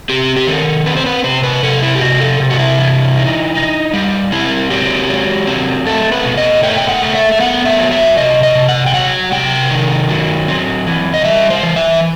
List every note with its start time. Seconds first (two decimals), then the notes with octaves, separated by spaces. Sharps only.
0.09 C4 G4
0.36 G4
0.47 D#3 A4
0.86 C4 B4
0.96 C5
1.06 B4
1.24 C3 C5
1.43 B4
1.63 C3 A4
1.82 E4
1.95 G4
2.01 C3 F#4
2.20 A4
2.40 C3
2.50 F#4
2.59 E4
2.78 E3
3.17 D#4
3.55 D#4
3.93 G3
4.32 C4 E4
4.70 F#3 G4
5.10 F#3
5.47 C4
5.86 A3 A4
6.12 B4
6.25 B2
6.37 D#5
6.63 A3 G5
6.78 G5
6.89 F#5
7.02 A3
7.15 E5
7.32 E5
7.40 B3 F#5
7.66 E5
7.79 F#3
7.91 E5
8.17 C3 D#5
8.43 D#5
8.55 C3
8.69 F#5
8.86 G5
8.94 F#3 F#5
9.32 C3 G5
9.71 D#3
10.09 F#3
10.48 C4
10.87 E3
11.14 D#5
11.24 G3 E5
11.50 C5
11.63 E3
11.76 E5